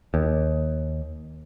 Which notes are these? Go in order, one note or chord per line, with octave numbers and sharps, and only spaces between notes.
D#2